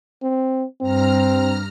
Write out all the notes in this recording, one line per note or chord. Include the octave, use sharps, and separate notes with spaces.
C4
G2 C4 A#5 F6